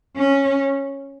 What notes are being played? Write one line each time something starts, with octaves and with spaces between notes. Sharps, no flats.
C#4